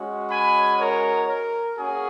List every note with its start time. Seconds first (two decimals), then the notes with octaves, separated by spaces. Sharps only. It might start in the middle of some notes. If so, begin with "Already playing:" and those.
Already playing: G#3 C#4 F#4
0.30 G#5 B5
0.78 A#4 C#5
1.28 A#4
1.77 A#3 C#4 F#4 G#4